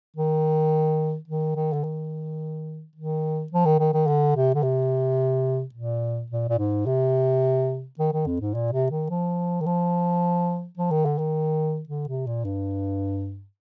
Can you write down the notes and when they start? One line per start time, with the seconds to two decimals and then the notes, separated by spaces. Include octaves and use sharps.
0.16 D#3
1.28 D#3
1.56 D#3
1.73 D3
1.84 D#3
2.96 D#3
3.52 F3
3.65 D#3
3.79 D#3
3.94 D#3
4.07 D3
4.36 C3
4.54 D3
4.63 C3
5.74 A#2
6.30 A#2
6.49 A#2
6.58 G#2
6.86 C3
7.99 D#3
8.13 D#3
8.27 F2
8.41 G#2
8.54 A#2
8.73 C3
8.91 D#3
9.10 F3
9.61 D#3
9.66 F3
10.77 F3
10.91 D#3
11.05 D3
11.18 D#3
11.89 D3
12.08 C3
12.27 A#2
12.45 G2